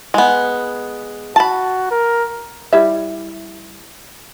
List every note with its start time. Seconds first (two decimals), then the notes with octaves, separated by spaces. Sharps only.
0.14 G#3 B3
1.36 F#4 A5 B5
1.91 A#4
2.73 G3 E4 E5